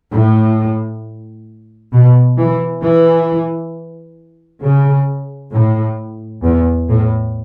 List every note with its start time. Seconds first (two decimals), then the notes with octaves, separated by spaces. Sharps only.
0.12 A2
1.93 B2
2.38 E3
2.83 E3
4.63 C#3
5.53 A2
6.43 E2
6.88 A2